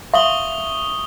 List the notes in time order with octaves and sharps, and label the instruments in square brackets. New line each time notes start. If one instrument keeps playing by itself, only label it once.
[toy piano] E5 F5 C6 [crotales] C#6 D#6 G7